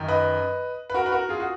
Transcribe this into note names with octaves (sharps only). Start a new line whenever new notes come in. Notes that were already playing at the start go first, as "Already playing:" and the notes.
Already playing: F#2 D#3
B4 D#5
B4
F#4 A#4
B4
F#4 A#4
F4 G#4
F#4